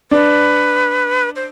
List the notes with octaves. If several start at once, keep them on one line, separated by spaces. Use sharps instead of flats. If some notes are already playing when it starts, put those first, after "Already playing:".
D4 B4
C5